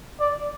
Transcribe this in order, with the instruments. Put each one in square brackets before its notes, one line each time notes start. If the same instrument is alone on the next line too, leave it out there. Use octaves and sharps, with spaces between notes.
[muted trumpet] D5